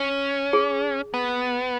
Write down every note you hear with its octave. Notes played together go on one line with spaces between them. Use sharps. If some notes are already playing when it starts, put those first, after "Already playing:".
Already playing: C#4
G#4
B3